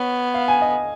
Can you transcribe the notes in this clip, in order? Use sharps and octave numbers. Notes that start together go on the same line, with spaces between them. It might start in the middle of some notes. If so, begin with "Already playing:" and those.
Already playing: B3 C#5
F5
G#5
D#5